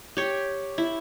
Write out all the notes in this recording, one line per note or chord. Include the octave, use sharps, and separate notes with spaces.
G4 C#5
E4